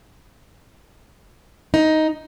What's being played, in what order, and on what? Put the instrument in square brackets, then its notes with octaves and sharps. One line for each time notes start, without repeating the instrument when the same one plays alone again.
[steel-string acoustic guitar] D#4